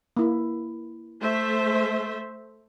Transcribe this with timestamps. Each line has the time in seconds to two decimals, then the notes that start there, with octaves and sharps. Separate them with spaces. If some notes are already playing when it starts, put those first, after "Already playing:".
0.17 A#3 E4
1.20 A3 C5 E5